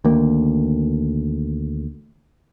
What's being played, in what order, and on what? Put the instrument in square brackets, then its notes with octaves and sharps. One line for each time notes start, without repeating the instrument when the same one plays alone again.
[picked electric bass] D2 D#3 A#3